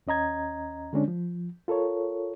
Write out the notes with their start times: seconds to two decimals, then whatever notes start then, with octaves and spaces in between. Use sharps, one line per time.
0.07 D#2 C#4 D#5 A#5 G#6
0.93 D3 G#3 C#4 D4
1.08 F3
1.68 F4 A4 A#4 C#5